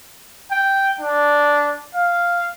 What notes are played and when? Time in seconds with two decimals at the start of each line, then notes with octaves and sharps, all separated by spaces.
0.51 G5
1.00 D4
1.95 F5